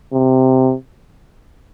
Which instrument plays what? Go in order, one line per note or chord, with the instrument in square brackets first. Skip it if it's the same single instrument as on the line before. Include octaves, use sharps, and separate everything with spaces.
[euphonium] C3